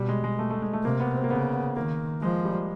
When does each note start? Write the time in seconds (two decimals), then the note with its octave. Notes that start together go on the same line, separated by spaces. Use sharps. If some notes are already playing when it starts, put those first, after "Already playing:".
Already playing: B2 G3
0.08 G#3
0.24 G#3
0.39 A3
0.50 A3
0.62 G#3
0.73 A3
0.85 C3 A#3
1.00 B3
1.15 C4
1.24 A#3
1.30 C#3 B3
1.53 B3
1.76 D#3 A#3
2.22 F3 G#3
2.45 G3